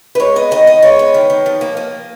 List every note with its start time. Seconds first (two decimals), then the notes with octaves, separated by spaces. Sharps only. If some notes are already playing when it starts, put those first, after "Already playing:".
0.15 B4
0.20 G#3 C#5
0.36 B3 D#5
0.51 D#3 D#5
0.67 B3 D#5
0.82 G#3 C#5
0.99 B3
1.14 D#3
1.30 D#3
1.46 F3
1.61 A#3
1.77 A#3